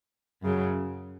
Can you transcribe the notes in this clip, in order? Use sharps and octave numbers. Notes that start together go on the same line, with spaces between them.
F#2 C#3 F#3